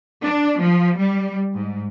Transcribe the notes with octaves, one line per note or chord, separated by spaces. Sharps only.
D4
F3
G3
G#2